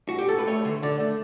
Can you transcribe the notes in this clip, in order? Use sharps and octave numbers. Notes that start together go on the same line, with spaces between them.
F#4
G4
A4
B4
A3 C#5
D3
D3 D5
A3